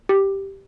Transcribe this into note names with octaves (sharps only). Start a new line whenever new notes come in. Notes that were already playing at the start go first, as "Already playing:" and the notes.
G4